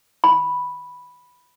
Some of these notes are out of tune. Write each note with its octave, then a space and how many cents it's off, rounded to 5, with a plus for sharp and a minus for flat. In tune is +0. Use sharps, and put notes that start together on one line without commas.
B5 -5